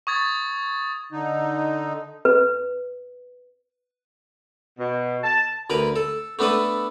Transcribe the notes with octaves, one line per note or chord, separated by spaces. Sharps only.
C#6 D#6 G#6 A6
D3 D#4
B4
B2
A5
D2 A#4 B4
A4
A3 B3 D4 A4 B4